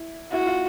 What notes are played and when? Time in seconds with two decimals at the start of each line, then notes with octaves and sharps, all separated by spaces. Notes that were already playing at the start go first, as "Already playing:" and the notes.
Already playing: E4
0.32 E4 F#4
0.47 F4